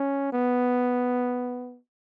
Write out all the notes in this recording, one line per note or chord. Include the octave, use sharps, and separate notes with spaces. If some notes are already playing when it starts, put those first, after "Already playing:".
Already playing: C#4
B3